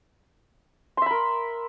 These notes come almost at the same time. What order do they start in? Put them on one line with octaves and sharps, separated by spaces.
C6 E5 B5 A#4